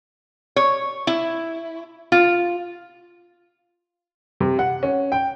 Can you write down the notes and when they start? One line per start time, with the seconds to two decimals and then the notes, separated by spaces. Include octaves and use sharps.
0.56 C#5
1.07 E4
2.12 F4
4.40 C3
4.59 F#5
4.83 C#4
5.12 G5